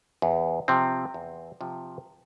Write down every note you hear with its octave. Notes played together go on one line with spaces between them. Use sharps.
E2
C3 F3 C4
E2
C3 F3